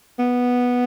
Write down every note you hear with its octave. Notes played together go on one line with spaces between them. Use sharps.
B3